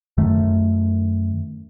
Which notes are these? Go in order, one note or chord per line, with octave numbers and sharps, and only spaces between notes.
F#2 D#3 A3